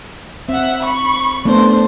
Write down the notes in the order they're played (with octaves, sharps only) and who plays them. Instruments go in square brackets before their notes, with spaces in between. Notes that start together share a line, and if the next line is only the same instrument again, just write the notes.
[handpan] C4 [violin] E5 F#5
[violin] B5 C#6
[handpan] A3 B3 [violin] D4 C5